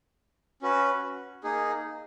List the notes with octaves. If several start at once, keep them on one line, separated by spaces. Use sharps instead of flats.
C#4 F#4 B4
A#3 D#4 G#4